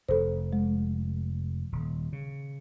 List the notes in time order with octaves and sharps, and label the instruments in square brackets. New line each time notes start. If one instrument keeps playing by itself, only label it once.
[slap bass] F1 [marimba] A4 C5
[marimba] G#3
[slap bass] D#1
C#3